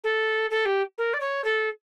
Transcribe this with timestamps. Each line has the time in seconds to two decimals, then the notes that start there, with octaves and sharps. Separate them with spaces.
0.04 A4
0.51 A4
0.65 G4
0.98 A#4
1.14 D5
1.20 C#5
1.44 A4